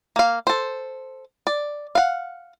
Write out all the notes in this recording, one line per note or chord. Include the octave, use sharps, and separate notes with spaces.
A#3 F5
A4 C5
D5
F5 F#5